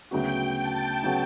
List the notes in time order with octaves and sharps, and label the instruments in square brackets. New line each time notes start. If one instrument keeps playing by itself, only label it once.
[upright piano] D2 C#3 F#3 B3 F#4 [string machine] G5
[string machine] A5
[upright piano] C#3 F#3 B3 F#4